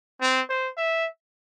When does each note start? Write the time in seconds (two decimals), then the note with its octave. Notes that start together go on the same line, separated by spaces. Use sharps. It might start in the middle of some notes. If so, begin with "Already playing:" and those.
0.22 C4
0.49 C5
0.77 E5